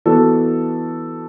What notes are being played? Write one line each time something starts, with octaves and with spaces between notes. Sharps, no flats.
E3 B3 F#4 A4 D5